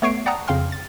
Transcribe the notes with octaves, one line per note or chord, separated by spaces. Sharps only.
A3 B3 C#5 C#6 C7 D7
D5 F#5 G5 A5 A#5 D#6
F2 C#3 F5 G5 C6 F6
A6